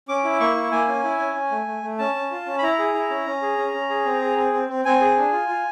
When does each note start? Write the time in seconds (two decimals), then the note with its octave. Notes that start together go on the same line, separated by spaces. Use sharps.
0.08 C#4 D6
0.24 E4
0.40 A#3 C#6
0.56 E4
0.72 A#3 G#5
0.88 C#4
1.04 E4
1.19 C#4
1.35 C#4
1.51 A3
1.67 A3
1.83 A3
1.99 C#4 A5
2.15 C#4
2.31 F4
2.46 C#4
2.58 B5
2.63 E4 A#5
2.79 G#4
2.94 E4
3.10 C#4
3.26 C#4
3.42 G#4
3.58 C#4
3.74 C#4
3.90 G#4
4.05 C4
4.22 G#4
4.37 C4
4.53 C4
4.69 C4
4.85 C4 G#5
5.01 G#4
5.17 D4
5.33 F4
5.48 F4